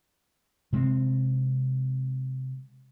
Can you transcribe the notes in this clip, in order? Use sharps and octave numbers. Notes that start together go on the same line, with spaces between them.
C3 G#3 A3 C4